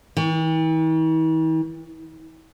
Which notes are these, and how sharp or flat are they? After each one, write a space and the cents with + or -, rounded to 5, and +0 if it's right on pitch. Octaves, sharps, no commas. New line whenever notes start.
E3 -45